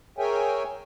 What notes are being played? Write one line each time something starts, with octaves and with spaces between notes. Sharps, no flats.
G#4 A#4 C#5 E5 G5 G#5